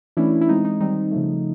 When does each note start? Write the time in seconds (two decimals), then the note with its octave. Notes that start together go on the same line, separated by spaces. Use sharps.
0.17 E3 A3 C#4 D4 E4
0.41 E4
0.48 E3 G#3 C4 D#4
0.65 D#4
0.80 D#3 G3 C4 D#4
1.11 C#3 F3 A3